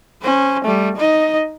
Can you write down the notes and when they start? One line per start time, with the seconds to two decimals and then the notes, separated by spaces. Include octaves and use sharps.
0.22 C#4 C5
0.64 G3 A3
0.96 D#4 D#5